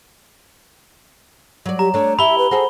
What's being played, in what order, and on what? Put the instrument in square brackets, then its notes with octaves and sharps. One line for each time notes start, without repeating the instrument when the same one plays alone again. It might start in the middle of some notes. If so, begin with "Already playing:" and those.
[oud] F#3 D5
[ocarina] G4 [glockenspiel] A#5
[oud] A3 D4 [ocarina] C#5
[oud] E4 G4 [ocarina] E5 [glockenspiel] B5 G7
[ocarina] B4
[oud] F#4 G#4 A4 [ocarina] C5